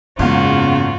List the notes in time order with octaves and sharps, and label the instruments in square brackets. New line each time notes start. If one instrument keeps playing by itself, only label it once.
[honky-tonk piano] F#1 E2 F5 [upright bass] G#2 [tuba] C#3 [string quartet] F4 F#4